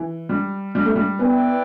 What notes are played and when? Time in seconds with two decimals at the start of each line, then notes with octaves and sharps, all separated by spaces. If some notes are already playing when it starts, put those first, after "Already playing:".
Already playing: E3
0.29 G3
0.75 G3
0.86 A3
0.96 G3
1.19 B3 E4 B4 D5 G5